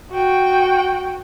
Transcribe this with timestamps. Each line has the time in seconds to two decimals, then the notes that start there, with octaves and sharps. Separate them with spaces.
0.12 F#4 G5